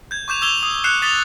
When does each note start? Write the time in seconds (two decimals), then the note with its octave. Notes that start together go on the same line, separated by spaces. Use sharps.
0.11 G6 G#6
0.28 C#6 D6 G6 E7 F7
0.42 D6 E6 G#6 F7 G7
0.63 D#6
0.84 F#6 G6 C7 C#7 E7 F7
1.02 D#6 A6 B6 F7 G7